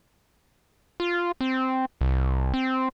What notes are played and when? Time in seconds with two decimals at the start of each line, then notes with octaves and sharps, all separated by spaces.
1.00 F4
1.41 C4
2.01 C2
2.54 C4